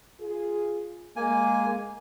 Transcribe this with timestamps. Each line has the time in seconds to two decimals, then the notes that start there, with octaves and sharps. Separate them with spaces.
0.20 F4 G#4
1.16 G#3 A#3 G#5